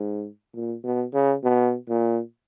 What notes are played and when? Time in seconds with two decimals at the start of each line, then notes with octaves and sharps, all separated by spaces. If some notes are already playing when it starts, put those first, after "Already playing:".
Already playing: G#2
0.54 A#2
0.83 B2
1.13 C#3
1.43 B2
1.88 A#2